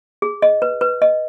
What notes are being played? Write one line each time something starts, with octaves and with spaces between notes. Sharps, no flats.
G#4
D#5
B4
B4
D#5